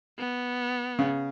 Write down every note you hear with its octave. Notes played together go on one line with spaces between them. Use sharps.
B3
C#3